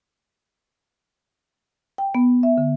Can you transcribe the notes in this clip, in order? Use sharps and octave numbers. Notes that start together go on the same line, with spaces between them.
G5
B3
E5
D3